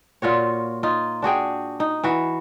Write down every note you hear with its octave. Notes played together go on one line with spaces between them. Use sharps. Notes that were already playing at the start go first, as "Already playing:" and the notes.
A#2 F4 F#4 C#5
D#4 F4
D4 F#4 G#4 G5
D#4
E3 F#4